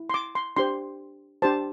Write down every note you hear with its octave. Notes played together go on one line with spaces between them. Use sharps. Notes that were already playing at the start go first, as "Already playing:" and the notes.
Already playing: E4
C6
D6
C6
D4 G4 C5 C6
D4 G4 C5 A5